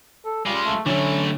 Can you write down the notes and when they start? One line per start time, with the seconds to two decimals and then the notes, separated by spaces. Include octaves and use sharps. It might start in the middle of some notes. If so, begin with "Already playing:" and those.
0.25 A4
0.45 G3 G#3 F4
0.64 A3
0.86 D3 E3 F#3 A3 C#4